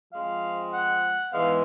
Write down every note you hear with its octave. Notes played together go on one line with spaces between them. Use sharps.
F3 G#3 C4 F5
F#5
G#2 E3 G#3 B3 F5